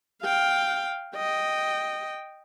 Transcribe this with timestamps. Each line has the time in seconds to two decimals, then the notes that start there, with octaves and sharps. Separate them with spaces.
0.22 F5 G5
1.16 D#5 G5